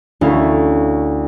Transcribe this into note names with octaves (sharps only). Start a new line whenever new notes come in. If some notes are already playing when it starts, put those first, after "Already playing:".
D2 C#4 E4 F5